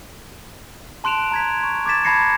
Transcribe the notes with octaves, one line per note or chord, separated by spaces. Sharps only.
A5 C6 F#6 D7 E7 F7
A#5 G#6 B6
C#6
D6 F#6 G#6 A6 B6 E7
A5 B5 G#6 A#6 C7 C#7